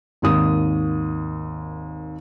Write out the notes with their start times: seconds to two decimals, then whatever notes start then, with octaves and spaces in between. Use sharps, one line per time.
0.22 G#1 D#2 D#6